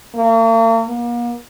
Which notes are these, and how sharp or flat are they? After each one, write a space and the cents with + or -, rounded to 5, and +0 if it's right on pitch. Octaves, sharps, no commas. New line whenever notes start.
A#3 -45
A#3 +40